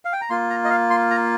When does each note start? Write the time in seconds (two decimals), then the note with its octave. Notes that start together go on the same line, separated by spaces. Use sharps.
0.05 F5
0.13 G5
0.21 A#5
0.30 A#3 F4 C6
0.50 A#5
0.65 D#5
0.70 F5
0.90 C6
1.10 A#5